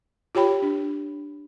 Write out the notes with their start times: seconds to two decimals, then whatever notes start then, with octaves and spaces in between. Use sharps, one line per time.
0.35 F4 G4 C#5 G5 B5
0.62 D4